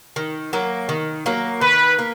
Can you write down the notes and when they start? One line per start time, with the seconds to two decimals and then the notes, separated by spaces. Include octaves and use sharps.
0.16 D#3
0.53 F#3 A#3
0.89 D#3
1.26 F#3 A#3
1.61 D#3 B4
1.99 A#3